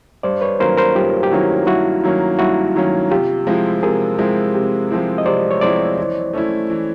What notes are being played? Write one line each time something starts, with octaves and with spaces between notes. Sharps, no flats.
G2 C5 D5
B4 C#5
D#3 F#3 A#3 C#4 A#4 C5
A#4 C5
G2 F4 G4
G4
D#3 F#3 A#3 C#4 E4 F#4
G2 E4 F#4
D#3 F#3 A#3 C#4
G2 E4 F#4
D#3 F#3 A#3 C#4
C3 F4 G4
F3 G#3 C4 E4
C3 G#4 A#4
F3 G#3 C4 E4
C3
F3 G#3 C4 E4
D#5
C3 C5 D5
C#5
F3 G#3 C4 E4 C5 D5
E3
A3 C#4 E4
E3